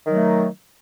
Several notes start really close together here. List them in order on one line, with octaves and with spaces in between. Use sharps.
D#3 F#3 A3